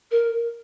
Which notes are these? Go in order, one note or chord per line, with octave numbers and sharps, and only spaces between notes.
A#4